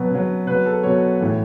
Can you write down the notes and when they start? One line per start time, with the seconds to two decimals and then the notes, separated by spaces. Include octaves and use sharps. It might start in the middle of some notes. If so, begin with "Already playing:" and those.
Already playing: B2 F#3 B4
0.11 B2 F#3
0.47 B2 F#3 B4
0.66 A4
0.83 B2 F#3 C#5
1.21 A2 E3